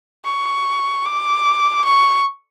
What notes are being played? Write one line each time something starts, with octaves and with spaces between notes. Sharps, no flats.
C#6
D6
C#6